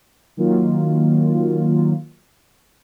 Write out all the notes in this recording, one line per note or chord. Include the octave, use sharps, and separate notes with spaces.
D#3 F#3 A#3 F4